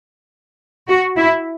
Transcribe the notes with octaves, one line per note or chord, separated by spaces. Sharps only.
F#4
E4